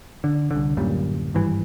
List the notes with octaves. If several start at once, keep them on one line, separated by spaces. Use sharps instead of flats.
D3
C2 D3
D1 F#2 A#2 G3
G#1 G2 E3